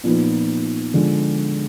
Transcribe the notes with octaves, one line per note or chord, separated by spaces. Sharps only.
A#2 F3 B3 D#4
D3 F3 G#3